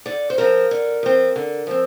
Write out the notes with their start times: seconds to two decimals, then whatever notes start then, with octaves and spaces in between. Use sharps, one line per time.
0.06 D3 D5
0.30 C5
0.38 F3 C4 A#4
0.71 D3
1.03 F3 C4
1.36 D3
1.67 F3 C4